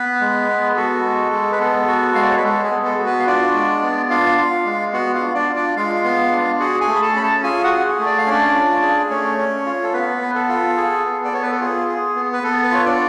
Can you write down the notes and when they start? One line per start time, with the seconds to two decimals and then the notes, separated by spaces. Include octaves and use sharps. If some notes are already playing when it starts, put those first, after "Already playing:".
Already playing: B3 B4
0.21 G#3
0.49 B3
0.76 F#4 A4
1.04 G#3
1.32 G#3
1.52 B4
1.59 B3 A4
1.87 F#4
2.15 G#3 F5
2.22 D5
2.29 C#5
2.37 B4
2.43 G#3 A4
2.64 G#4
2.71 B3
2.85 A4
2.98 F#4
3.06 B3 B4
3.19 F5
3.26 D4 F4 D5
3.54 G#3
3.82 B3
4.10 D4 F4 F5
4.38 F4
4.66 G#3
4.93 B3 F#4 F#5
5.14 F4 F5
5.21 D4
5.35 D4 D5
5.49 F4
5.56 D4 D5
5.77 G#3 F4 F5
6.04 B3
6.32 D4
6.60 F#4 G#4 F#5
6.81 G#4 G#5
6.88 A3
6.96 B5
7.02 A4 A5
7.16 C#4 B5
7.22 A4 A5
7.43 F4 G#4 G#5
7.64 F#4 F#5
7.71 G#4
7.99 A3
8.06 D5
8.18 F5
8.26 C#4 D4 D5
8.55 F4
8.82 G#4
9.10 A3 C#4 C#5
9.38 C#4
9.66 F4
9.84 A4
9.93 B3 B4
10.21 B3
10.35 A4
10.49 F4
10.77 G#4
11.05 B3
11.25 D5
11.32 B3 C#5
11.42 B4
11.52 A4
11.60 F4 G#4
11.88 G#4
12.16 B3
12.33 B4
12.43 B3 A4
12.64 B4
12.72 F4 C#5
12.85 D4 D5